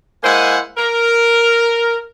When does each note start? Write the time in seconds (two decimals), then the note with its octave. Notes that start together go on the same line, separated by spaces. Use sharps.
0.23 G#3 A#3 E4 C5 F#5 G#5
0.77 A#4